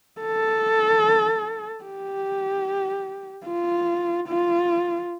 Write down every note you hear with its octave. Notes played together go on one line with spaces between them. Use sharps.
A4
G4
F4
F4